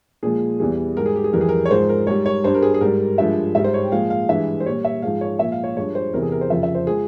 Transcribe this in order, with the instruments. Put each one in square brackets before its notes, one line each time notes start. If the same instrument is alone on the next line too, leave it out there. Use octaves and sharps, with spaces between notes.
[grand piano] A#2 F3 G#3 G#4
E2 E3 G3 G#4
G#2 G3 A#4
G#4
G4
G#4
F2 E3 G3 A#4
G#4
A#4
C#5
G#2 F3 G#3 C5
A#4
G#2 G3 C#5
C#5
G2 G3 C5
A#4
G#4
G#4
G#2 G3 A#4
G2 F3 G#3 E5
G#2 G3 E5
C5
C#5
G5
A#2 F3 G#3 F5
F5
G2 E3 G#3 E5
C5
A#2 G3 C#5
E5
G#2 F3 G#3 F5
C#5
A#2 F3 G#3 E5
F5
C#5
G2 F3 G#3 C#5
C5
E2 C3 E3 A#4
G#4
A#4
C5
F2 C#3 F3 E5
E5
C5
F3 G#3 G#4